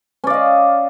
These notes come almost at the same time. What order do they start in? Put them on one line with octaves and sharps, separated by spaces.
C#4 D5 F5 D#5